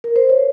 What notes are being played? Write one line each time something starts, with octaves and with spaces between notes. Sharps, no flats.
A#4
C5
C#5